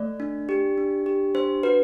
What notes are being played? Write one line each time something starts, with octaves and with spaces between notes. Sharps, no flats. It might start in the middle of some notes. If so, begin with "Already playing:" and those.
Already playing: A3 D5
D4
G4
D4
G4
D4 C5
F#4 B4